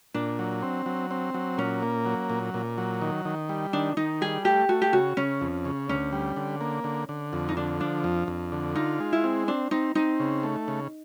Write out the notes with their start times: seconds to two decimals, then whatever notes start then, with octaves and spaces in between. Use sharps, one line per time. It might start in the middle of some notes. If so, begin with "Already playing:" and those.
0.14 A#2 D4
0.39 F#3
0.62 C4
0.86 F#3
1.11 C4
1.34 F#3
1.58 A#2 C#4
1.82 A#3
2.06 F#3
2.30 A#2
2.54 A#2
2.78 F#3
3.02 D#3
3.25 D#3
3.49 G3
3.73 D#3 D4
3.97 D#3 D#4
4.21 G3 G#4
4.45 A3 G4
4.69 A3 F#4
4.82 G4
4.93 C#3 F#4
5.17 C#3 C#4
5.41 F2
5.65 C#3
5.89 D2 C#4
6.12 G3
6.36 D3
6.61 A#3
6.84 D3
7.09 D3
7.33 F2
7.49 D#4
7.57 D3 D4
7.80 F3 D4
8.04 F2
8.28 F2
8.52 D3
8.75 D#4 F4
9.00 G#3
9.13 E4
9.24 C4
9.48 C4 D4
9.71 C4 D#4
9.95 C4 D#4
10.20 C#3
10.43 A3
10.68 C#3